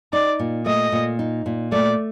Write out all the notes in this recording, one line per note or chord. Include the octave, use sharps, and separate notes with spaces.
D#4 D5
A#2
A3 D#5
A#2
D#4
A#2
A3 D5